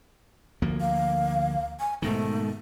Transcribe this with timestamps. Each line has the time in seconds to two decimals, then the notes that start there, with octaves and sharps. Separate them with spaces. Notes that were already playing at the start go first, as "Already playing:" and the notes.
0.62 D2 F3 A#3
0.81 F5
1.80 G#5
2.02 G#2 B2 D#3 A3